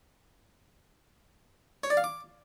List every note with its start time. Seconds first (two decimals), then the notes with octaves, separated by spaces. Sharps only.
1.84 C#5
1.90 D5
1.97 F5
2.04 D6